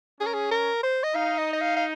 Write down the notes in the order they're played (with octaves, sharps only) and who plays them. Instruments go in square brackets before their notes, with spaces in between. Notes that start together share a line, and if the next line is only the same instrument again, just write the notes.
[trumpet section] C#4 [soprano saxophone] G#4
[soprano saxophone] A#4
G#4
A#4
C5
D#5
[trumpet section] D#4 [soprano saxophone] F5
[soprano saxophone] D#5
D#5
F5
F5